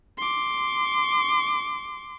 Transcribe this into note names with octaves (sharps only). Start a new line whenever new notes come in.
C6 D6